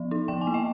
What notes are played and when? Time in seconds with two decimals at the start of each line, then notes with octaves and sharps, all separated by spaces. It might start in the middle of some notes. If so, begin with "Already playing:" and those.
Already playing: F3
0.11 D#4
0.28 F3 G5
0.41 G#5
0.47 A#3
0.54 D#5 G5